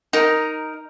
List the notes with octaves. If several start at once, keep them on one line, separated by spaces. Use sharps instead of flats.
D#4 A#4